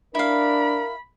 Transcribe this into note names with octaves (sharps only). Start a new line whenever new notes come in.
D4 E4 A#4 F5 B5